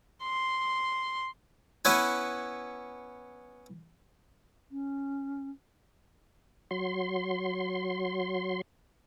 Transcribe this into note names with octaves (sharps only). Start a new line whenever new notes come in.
C6
B3 C#4 E4 B4 G#5
C#4
F#3 C6